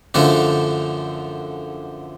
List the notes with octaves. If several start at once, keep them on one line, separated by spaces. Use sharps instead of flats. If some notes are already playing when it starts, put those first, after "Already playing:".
F#2 D3 F3 A3 D4